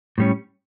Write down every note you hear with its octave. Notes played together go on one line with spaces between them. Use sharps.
A2 G3 C#4